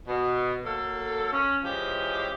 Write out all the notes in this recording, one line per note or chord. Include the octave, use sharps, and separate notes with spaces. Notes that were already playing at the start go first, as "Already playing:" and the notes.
B2
F#3 A#3 A4
C#4
E3 F3 G#3 C#4 G4